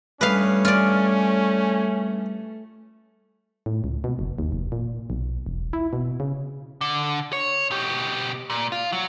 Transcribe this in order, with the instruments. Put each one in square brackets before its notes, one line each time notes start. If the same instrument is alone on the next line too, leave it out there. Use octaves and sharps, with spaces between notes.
[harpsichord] G2 D#6 [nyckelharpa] A3 [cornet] C#4 [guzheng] B4 F5
[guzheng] F4 D5
[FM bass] A2
C#2
B2
F#1
D#2
F1
A#2
B1
E1
E4
B2
C#3
[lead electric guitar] D3
C#5
B2 G4
A#2
F4
F#3